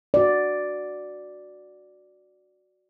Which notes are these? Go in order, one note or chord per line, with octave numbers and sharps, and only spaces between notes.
F#4 D5